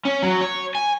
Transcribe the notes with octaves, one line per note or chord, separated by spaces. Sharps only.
C#4
F#3
C#5
G#5